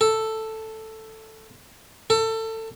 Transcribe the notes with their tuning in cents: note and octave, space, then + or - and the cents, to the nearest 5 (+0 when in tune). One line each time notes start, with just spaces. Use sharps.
A4 +5
A4 +25